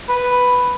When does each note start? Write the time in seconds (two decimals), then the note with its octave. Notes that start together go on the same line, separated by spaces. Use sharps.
0.09 B4